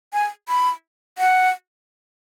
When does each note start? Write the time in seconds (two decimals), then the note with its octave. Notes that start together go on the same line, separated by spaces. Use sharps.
0.13 G#5
0.49 B5
1.18 F#5